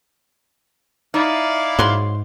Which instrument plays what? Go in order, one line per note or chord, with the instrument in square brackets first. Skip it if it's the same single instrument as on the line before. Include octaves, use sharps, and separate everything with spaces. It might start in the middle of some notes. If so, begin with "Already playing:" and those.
[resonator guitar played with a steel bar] D#4 [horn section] E4 D5 F5
[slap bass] G#2 [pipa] F#3 C6